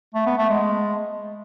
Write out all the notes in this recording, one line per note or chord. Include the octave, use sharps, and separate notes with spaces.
A3
B3
A3
G#3